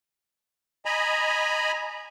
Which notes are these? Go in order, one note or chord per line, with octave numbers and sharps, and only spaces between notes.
D#5 G#5 A#5 B5